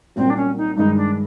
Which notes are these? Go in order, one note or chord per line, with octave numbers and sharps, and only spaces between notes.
C2 A#2 F#3 C4
D4
C#4
D#4
G2 D#3 G#3 D#4
D4